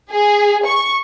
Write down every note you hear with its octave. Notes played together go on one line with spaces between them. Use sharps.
G#4
C#6